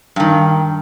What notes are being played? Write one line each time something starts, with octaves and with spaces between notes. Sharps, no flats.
G2 D#3